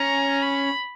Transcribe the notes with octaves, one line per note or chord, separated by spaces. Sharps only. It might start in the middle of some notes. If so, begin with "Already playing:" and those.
Already playing: C#4 A#5
B5